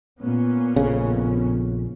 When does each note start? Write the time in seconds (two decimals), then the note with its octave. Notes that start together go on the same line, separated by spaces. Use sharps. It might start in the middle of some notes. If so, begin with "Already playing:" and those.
0.20 A#2 B3 C#4
0.76 A#1 F2 C#3